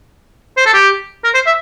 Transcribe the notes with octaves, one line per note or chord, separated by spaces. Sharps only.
C5
A4
G4
A#4
C5
E5